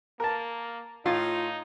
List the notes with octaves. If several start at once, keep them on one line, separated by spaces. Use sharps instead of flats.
A#3 A#4 A5
A2 D#4 F4